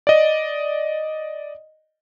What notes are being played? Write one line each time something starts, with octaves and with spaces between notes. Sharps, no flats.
D5 D#5